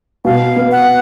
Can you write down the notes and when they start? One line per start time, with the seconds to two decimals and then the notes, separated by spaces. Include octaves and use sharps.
0.25 B2 F5
0.56 B3
0.72 F#5